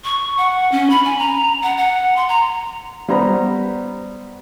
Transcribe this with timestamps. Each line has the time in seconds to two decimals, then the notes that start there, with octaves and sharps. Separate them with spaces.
0.04 C#6
0.38 F#5
0.72 C#4
0.90 B5
1.05 G#5
1.19 A#5
1.63 F#5
1.78 F#5
2.16 C6
2.29 A#5
3.08 G3 B3 C5 A#5